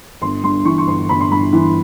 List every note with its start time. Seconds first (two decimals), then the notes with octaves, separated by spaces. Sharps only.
0.22 G1 C6
0.44 G2 C6
0.65 E3 C#6
0.78 C#6
0.87 G1 C6
1.09 G1 B5
1.21 C6
1.31 G2 B5
1.53 E3